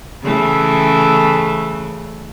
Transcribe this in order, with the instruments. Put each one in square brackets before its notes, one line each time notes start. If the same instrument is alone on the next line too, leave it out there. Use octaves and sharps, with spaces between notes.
[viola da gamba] C#3 E3 A3